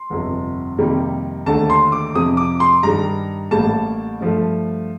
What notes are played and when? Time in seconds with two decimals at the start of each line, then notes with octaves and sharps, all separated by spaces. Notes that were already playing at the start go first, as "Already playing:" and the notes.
Already playing: C6
0.10 G1 F2 C3
0.78 F2 C3 D#3 G3 A#3
1.46 D#2 D3 A3 A5
1.70 C6
1.92 D6
2.15 F2 C3 F3 D#6
2.37 D6
2.60 C6
2.83 G2 D#3 G3 A#5
3.51 A1 A2 G3 A#3 A5
4.20 G2 F3 A3